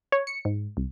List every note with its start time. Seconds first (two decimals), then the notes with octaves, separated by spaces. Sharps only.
0.12 C#5
0.27 C#7
0.45 G#2
0.77 C2